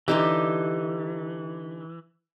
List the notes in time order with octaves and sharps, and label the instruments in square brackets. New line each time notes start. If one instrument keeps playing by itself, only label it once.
[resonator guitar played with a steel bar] D3 D#4 G4 [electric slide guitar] E3